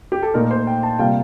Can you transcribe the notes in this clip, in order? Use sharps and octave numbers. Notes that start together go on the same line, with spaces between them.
G4
A4
A#2 A3 D#4 A#4
C5
G5
A5
C3 G3 A#3 F4 G5